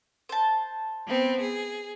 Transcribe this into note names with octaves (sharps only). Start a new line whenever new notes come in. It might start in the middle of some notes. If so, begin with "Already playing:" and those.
C5 A5
B3 C4
G#4